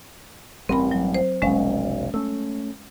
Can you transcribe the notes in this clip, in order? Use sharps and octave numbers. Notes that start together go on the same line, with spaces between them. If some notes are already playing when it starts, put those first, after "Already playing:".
A1 G2 G3 C4 A#4 B5
F#3
C5
F1 B1 G#3 C#4 F5
A3 C#4 E6